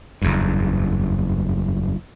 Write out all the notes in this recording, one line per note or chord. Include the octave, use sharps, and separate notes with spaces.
F#1 E2 G2